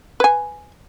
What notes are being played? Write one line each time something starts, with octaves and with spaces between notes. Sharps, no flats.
B4 G#5